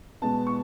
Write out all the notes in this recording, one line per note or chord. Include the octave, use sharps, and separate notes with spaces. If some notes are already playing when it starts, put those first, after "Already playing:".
B2 G#3 B3 A5
C#6